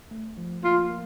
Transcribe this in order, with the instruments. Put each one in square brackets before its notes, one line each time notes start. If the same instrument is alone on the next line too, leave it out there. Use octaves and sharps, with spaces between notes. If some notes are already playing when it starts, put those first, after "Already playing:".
[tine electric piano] A3
F3
[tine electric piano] A#3 [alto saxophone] F4
[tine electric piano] A#3